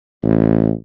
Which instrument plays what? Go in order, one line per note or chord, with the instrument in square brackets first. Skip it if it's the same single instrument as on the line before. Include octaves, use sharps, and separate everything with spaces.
[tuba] A1